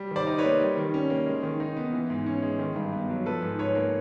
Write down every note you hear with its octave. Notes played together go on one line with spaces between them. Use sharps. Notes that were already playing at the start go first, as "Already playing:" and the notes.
Already playing: G3
D#3 C5 D5
D#4
B4 C#5
A#3
G3
D#3
C#4
A#3
G#3
D#3
D#4
B3
E3
G#2
C#4
G#3
D#3
G2
B3
F#3
F3 A4 B4
G#2
G#2 B4 C#5
A#3